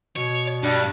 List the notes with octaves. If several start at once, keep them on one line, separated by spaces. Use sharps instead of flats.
B2 C#5
G2 G3 D4